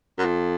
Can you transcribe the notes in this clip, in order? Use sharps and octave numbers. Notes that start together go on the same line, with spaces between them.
F#2
F2